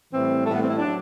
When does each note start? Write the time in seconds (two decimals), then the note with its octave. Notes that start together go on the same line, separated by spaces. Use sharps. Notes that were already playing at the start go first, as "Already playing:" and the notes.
0.14 A2 E3 G3 C4
0.46 A2 E3 G3 A3
0.54 B3
0.62 C4
0.70 E4
0.78 F#3 D4